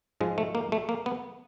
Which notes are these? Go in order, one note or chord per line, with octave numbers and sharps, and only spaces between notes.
G#2 F3 G#3
A3
A#3
A3
A#3
B3